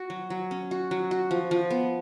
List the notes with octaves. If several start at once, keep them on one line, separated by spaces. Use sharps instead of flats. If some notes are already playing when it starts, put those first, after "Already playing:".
Already playing: F#4
F#3
F#3
C#4
F#4
F#3
F#4
F3
F3
B3